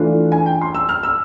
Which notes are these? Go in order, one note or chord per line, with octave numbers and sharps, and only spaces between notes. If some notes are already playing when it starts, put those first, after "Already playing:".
Already playing: E3 A3 D4 F4
G#5
G5
C6
E6
F6
E6